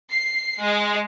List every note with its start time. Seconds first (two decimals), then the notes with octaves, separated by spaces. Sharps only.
0.10 C7
0.61 G#3